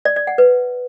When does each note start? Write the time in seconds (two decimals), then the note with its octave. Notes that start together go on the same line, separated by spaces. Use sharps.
0.05 D5
0.16 D5
0.27 F#5
0.38 B4